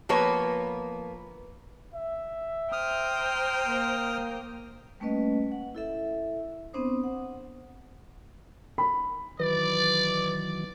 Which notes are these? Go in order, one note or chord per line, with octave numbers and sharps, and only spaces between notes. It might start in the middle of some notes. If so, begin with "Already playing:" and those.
F3 A#3 B3 B4 C#5
E5
C5 G5 A#5 D#6 F6
A#3
G3 A3 A#3 C#4 B4 D#5
F#5
E4 A4 E5
B3 C4 D4 C5 D#6
F#5
B5
D#3 E3 F#3 B4 D5